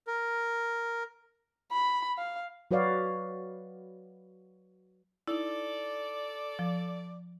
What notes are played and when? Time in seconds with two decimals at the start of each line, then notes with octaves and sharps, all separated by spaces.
0.07 A#4
1.72 B5
2.18 F5
2.71 F#3 F#4 B4 C#5 D5 F5
5.28 D#4 E4 A4 D5
6.59 F3